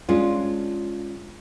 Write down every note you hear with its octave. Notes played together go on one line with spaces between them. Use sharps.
G#3 C#4 D4 F4